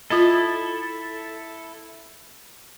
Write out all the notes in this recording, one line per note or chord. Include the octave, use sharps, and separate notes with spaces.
E4 F4 A4 D#5